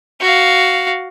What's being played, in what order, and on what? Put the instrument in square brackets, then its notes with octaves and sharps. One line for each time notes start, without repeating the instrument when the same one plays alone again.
[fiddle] F#4 F5